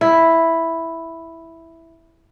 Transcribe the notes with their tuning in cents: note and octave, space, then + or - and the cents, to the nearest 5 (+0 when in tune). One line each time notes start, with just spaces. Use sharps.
E4 +0